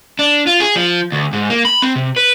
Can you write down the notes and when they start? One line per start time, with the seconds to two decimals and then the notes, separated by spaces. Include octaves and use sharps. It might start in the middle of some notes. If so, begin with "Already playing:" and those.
0.19 D4
0.47 F4
0.60 G#4
0.76 F3
1.12 D2
1.33 G#2
1.50 A#3
1.65 B5
1.82 C4
1.95 C3
2.16 B4